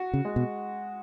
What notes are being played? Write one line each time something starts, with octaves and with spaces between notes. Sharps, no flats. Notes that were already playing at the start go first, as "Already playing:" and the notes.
Already playing: F#4
C#3
G#3
B2